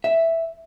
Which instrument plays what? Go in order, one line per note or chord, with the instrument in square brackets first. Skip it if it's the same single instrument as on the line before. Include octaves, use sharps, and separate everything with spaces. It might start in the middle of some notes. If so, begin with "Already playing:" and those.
[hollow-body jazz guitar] E5